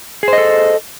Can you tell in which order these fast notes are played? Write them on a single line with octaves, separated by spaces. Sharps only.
G#4 C5 D#5 A4